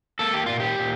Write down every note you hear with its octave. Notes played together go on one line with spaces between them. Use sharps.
A#3 A4
G4
A#2 F4
G4
A#2